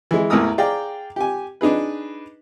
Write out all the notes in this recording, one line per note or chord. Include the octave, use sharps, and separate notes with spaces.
E3 G#3
A1 E2 A#4 A#5 D#6 E6
G#4 D5 F5 G5 A#5
G4 G#5
D4 D#4 G#4 B4